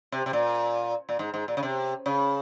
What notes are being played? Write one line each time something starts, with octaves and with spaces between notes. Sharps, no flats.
C3
C3
A#2
A#2
G#2
G#2
A#2
C#3
C3
C#3